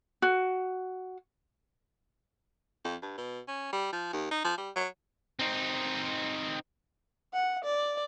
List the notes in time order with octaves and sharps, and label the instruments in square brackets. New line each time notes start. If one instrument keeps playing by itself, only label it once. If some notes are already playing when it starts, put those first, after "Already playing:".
[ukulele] F#4
[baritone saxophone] F2
G2
B2
C#4
G3
F3
D#2
D#4
F3
G3
F#3
[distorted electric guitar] C4 D#4
[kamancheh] F#5
D5